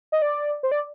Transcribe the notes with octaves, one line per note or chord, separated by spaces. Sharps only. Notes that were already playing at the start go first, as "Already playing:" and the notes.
D#5
D5
C5
D5